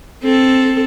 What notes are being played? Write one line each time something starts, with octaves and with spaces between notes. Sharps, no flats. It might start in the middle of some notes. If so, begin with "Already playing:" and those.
C4 A4